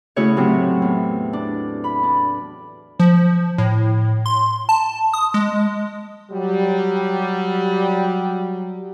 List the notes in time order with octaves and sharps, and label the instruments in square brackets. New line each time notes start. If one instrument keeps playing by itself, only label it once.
[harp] C#3 A3 E4 F#4 G#4 C#5
A2 C3 F#3 A3 C4
E2
D4
B5
D4
[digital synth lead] F3
A2
C6
A5
D#6
G#3
[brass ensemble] F#3 G3